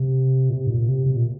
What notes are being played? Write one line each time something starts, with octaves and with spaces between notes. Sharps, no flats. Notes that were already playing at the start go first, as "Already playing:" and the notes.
Already playing: C3
A#2
C3
G#2
A#2
C3
C3
A#2